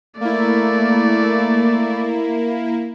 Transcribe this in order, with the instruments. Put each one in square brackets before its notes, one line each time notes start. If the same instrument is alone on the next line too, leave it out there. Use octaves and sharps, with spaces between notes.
[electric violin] A3 D5 [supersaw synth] A#3 E4